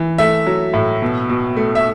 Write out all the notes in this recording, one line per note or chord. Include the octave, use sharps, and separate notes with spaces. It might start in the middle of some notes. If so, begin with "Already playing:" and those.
Already playing: E3
A3 E5
F#3
A2
B2
B2
A3
E5